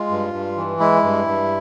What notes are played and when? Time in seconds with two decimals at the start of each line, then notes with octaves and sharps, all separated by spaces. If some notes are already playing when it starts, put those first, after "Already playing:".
Already playing: G#3 F4
0.10 G2
0.33 G2
0.57 E3
0.80 G#3 E4
1.03 G2
1.27 G2